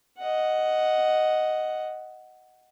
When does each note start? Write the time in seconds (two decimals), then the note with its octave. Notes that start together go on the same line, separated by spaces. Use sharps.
0.19 D#5 F#5